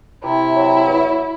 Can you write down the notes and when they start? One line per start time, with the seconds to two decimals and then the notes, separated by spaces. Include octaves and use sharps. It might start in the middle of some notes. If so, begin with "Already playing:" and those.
0.23 C3 E4
0.54 F#3
0.85 E2